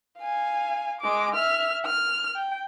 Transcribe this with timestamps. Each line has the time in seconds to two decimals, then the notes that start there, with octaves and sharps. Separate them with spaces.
0.20 F5 G#5
1.01 G#3 D6
1.35 E5 F6
1.87 F6
2.35 G5